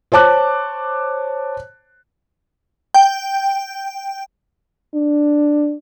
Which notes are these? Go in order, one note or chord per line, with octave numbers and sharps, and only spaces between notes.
C5 C#5 A5 D6 F#6
G5
D4